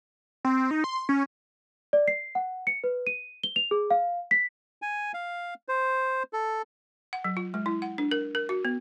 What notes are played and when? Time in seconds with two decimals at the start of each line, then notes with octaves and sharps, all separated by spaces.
0.45 C4
0.71 D#4
0.84 C6
1.09 C#4
1.93 D5
2.08 C7
2.35 F#5
2.67 C#7
2.84 B4
3.07 D#7
3.43 G7
3.56 F7
3.71 G#4
3.91 F5
4.31 B6
4.82 G#5
5.14 F5
5.68 C5
6.33 A4
7.13 F#5
7.24 F#3
7.37 F4
7.54 G#3
7.66 E4
7.82 F#5
7.98 D4
8.11 A#4
8.35 A#4
8.49 F#4
8.65 B3